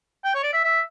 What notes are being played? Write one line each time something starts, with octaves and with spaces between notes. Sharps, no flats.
G5
C#5
D5
E5
E5